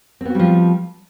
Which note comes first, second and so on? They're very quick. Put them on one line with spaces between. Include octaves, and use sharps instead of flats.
C4 B3 F#4 G3 F3